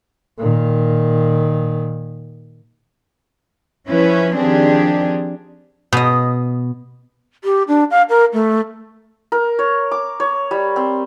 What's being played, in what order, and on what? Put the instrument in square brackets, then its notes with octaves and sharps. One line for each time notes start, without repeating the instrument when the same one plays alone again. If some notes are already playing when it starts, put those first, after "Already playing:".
[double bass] A#2 D#3
[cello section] F3 C#4 E4 B4
D#3 F3 C4 D4 G4 G#4
[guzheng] B2 D#5
[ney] G4
D4
F5
A#4
A3
[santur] A#4
C#5
D6
C#5
G3
C4